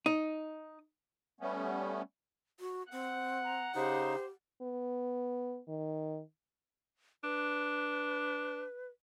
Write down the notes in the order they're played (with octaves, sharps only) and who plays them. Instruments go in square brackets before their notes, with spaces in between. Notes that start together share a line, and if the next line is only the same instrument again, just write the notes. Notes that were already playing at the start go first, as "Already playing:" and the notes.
[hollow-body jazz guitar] D#4
[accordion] G3 A3 B3 C#4
[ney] F#4
[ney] C4 [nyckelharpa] F#5
[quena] A#5
[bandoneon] C#3 D#4 [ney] G4 [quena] C5
[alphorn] B3
D#3
[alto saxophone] D4 [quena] B4